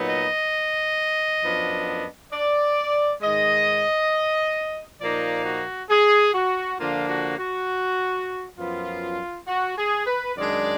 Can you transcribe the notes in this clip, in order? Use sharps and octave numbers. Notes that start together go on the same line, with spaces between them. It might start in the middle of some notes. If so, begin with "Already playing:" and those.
Already playing: A#2 F#3 B3 D#4
D#5
F#2 F3 B3 D4
D5
G#2 D#3 G#3 D#5
A#2 F3 A#3 D#4 D5
F#4
G#4
F#4
D3 F3 A#3 D4 F4
F#4
F#4
F#2 F3 B3 F4
F#4
G#4
B4
F#2 D#3 G#3 D4 D5